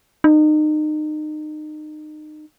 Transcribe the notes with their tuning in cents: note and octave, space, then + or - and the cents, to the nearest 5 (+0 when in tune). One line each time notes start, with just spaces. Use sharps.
D#4 -30